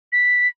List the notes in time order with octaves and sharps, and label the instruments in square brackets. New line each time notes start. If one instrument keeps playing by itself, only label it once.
[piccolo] B6